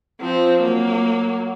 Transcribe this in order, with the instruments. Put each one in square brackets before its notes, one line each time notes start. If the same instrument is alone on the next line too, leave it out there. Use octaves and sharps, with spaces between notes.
[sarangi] F3 [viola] C4
[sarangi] F#3 [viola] A#3